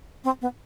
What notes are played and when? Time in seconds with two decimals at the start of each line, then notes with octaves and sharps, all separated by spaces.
0.24 C4
0.42 B3